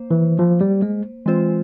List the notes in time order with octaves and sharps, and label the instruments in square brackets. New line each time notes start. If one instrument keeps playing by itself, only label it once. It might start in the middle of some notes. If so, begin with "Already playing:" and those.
Already playing: [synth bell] A#3 C5
[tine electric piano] E3
F3
G3
G#3
[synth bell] E3 G#3 C4 F4 C5